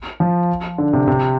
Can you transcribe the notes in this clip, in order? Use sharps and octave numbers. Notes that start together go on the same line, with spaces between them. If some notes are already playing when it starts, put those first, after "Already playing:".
F3
D3
C3
C3